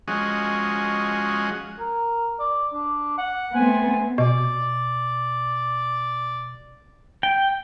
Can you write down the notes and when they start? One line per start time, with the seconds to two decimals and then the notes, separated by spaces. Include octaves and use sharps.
0.08 F3 G#3 C#4 F#4 D#5
1.79 A#4
2.39 D5
2.73 D4
3.18 F#5
3.55 A3 B3 C4 G#5
4.18 B2 D5
7.23 G5